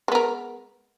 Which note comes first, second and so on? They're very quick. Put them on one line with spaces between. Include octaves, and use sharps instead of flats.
G#3 B3 A#4